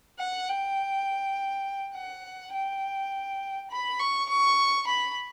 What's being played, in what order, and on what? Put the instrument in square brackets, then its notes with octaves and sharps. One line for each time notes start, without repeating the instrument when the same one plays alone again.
[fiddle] F#5
G5
F#5
G5
B5
C#6
C#6
B5